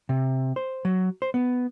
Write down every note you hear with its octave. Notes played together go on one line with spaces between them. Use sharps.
C3
C5
F#3
C5
B3